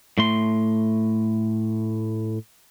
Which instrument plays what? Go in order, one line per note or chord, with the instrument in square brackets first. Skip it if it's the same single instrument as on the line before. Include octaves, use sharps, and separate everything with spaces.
[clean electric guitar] A2 A3 C6